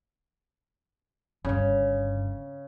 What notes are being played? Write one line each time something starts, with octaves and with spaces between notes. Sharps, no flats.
G1 G2 C#3